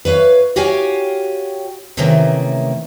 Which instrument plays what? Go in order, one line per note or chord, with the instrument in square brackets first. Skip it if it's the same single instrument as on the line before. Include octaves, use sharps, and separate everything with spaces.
[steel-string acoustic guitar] B4 C#5 E5 F5
F#4 G4 C#5 F5 G5 G#5
C3 D#3 E3 A3 A#3 C#4